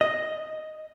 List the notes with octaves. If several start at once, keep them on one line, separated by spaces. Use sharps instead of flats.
D#5